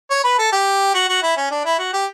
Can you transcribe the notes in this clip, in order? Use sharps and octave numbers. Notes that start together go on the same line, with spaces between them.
C#5
B4
A4
G4
F#4
F#4
E4
C#4
D4
E4
F#4
G4